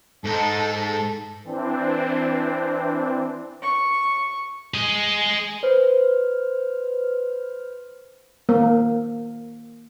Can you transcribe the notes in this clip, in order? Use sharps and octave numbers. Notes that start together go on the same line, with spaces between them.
G#2 D#4 A4
E3 C4 D4
C#6
G#4 D#5
B4 C5 F6
A#3